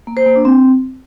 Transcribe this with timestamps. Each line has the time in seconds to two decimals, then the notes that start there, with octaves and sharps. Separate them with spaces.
0.07 A#3
0.17 C5
0.26 A#3
0.36 D4
0.45 C4